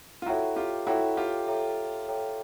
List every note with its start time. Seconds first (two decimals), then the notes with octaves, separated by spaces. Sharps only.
0.22 F4
0.26 E4 F#4 A4 C#5 E5 G5 A#5
0.56 F4 G4
0.87 E4 F#4 A4 C#5 E5 G5 A#5
1.17 F4 G4
1.47 A4 C#5 E5 G5 A#5
2.08 A4 C#5 E5 G5 A#5